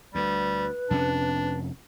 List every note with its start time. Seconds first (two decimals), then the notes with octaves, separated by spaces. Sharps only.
0.15 D2 G3 B4
0.91 F2 C3 C#4 D4